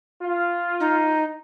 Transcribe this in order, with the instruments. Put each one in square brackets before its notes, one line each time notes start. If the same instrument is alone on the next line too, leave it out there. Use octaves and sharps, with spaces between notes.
[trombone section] F4
[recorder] D#4